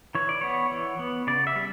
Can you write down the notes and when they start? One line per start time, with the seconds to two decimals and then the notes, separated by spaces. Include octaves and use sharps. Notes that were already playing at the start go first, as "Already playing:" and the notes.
0.15 E3 C#5
0.29 D5
0.41 B3 C#5
0.71 E3
0.99 B3
1.27 C#3 D5
1.47 E5
1.56 G3